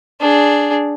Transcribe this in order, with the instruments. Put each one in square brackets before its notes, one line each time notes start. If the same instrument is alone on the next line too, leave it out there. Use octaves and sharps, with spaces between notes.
[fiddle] D4 G#4